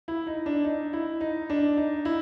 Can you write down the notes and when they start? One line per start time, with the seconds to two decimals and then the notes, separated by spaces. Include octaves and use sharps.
0.08 E4
0.27 D#4
0.46 D4
0.65 D#4
0.93 E4
1.21 D#4
1.50 D4
1.77 D#4
2.05 E4